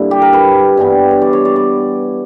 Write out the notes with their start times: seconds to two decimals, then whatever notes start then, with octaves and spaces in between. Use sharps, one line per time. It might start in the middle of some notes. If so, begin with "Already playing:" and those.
Already playing: G2 D3 A#3 E4
0.11 G4
0.22 A#4
0.33 B4
0.77 G2 E3 G3 B3
1.11 C#5
1.22 D5
1.33 C#5
1.45 D5
1.56 D5